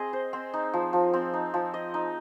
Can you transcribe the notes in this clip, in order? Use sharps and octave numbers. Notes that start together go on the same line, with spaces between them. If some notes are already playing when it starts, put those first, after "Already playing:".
Already playing: C4 G#4 D#5
C5
C4
D#4
F3
F3
C4
D#4
F3
D#5
D#4